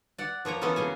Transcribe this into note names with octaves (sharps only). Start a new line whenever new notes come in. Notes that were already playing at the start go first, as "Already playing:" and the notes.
D5 F#5
F3 A#3 C#5 A#5
E3 B3 C#4 F#4 A4 B4
C#3 A#3 G#5